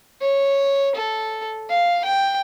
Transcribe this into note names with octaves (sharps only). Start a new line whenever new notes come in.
C#5
A4
F5
G5